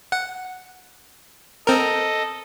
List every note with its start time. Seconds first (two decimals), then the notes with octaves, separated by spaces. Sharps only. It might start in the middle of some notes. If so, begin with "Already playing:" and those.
0.12 F#5
1.67 C4 A4 A#4 D#5